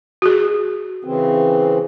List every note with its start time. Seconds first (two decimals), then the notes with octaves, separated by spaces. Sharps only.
0.22 F#4 G#4
1.05 C#3 E3 C4